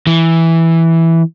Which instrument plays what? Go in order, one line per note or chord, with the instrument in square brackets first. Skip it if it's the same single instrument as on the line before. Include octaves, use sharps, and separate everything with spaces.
[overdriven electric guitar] E3